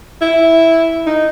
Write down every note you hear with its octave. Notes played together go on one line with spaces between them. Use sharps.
E4
D#4